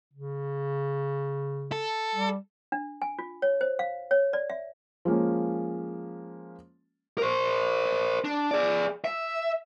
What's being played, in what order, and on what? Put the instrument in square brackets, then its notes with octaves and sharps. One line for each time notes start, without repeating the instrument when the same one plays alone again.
[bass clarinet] C#3
[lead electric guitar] A4
[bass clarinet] G3
[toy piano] D4
G#5
F4
C#5
C5
F5
C#5
D5
E5
[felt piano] F3 G#3 A#3 C#4
[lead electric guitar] A#4 C5
D4
G#4 D5
E5